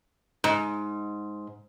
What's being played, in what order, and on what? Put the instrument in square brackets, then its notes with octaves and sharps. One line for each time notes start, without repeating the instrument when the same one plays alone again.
[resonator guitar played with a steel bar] G#2